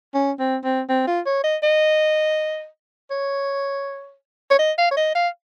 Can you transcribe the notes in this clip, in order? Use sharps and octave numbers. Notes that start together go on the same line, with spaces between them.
C#4
C4
C4
C4
F4
C#5
D#5
D#5
C#5
C#5
D#5
F5
C#5
D#5
F5